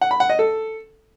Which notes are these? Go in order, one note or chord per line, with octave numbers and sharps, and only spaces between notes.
F#5
B5
F#5
D#5
A4